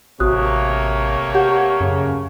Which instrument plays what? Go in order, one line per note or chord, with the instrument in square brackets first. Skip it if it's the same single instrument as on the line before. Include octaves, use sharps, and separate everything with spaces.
[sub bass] A1 [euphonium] C3 [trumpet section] A3 A#3 C#5 [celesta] F#4 D#6 F#6
[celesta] G4 F#5 G6
[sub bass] F#2 [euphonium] C#3